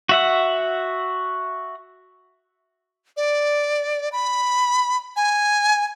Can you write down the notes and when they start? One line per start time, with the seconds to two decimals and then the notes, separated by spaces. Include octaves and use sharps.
0.09 F#4 E5 F#5
3.17 D5
4.12 B5
5.16 G#5